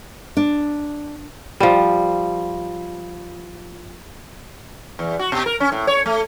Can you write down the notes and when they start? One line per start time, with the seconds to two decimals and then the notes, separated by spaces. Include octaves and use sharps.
0.37 D4
1.60 F3 G3
4.99 E2
5.19 F#4
5.32 B2
5.46 A#4
5.60 C#4
5.72 A2
5.87 C#5
6.06 A3